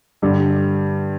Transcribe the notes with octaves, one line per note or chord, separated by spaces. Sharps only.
G2 D3 G3